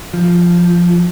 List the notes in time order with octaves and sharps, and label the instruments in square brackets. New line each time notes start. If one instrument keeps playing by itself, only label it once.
[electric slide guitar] F3